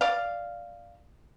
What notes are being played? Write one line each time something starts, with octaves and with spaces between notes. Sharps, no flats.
D5 F5